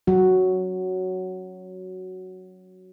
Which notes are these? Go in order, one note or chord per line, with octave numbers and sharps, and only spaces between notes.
F#3 F#4